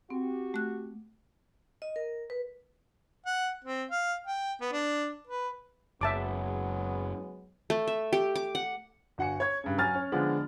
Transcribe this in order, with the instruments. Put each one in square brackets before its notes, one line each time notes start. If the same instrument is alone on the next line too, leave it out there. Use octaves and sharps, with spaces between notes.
[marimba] C4 [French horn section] F#4 G4
[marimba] A3 F#6
[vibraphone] D#5
A#4
B4
[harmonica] F#5
C4
F5
G5
B3
D4
B4
[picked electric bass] F#1 [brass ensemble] F#3 G#3 B3 [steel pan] E5 A5 D6
[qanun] A3
E5
G4
D6
F#5
[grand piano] G1 F#4 F#5 G#5 C#7
C#5 G#6
G2 C#3
F#3 G#5 F6 A6
C#4
D3 F3 G#3 B3 D4